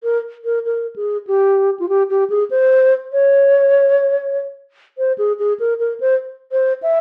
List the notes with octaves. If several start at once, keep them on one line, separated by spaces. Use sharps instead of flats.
A#4
A#4
A#4
G#4
G4
F4
G4
G4
G#4
C5
C#5
C5
G#4
G#4
A#4
A#4
C5
C5
E5